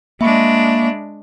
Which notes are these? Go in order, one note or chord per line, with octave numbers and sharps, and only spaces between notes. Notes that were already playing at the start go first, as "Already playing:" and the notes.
G#3 A#3 D4 E5 B5 C#6